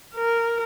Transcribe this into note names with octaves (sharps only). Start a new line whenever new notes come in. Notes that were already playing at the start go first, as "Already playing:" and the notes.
A#4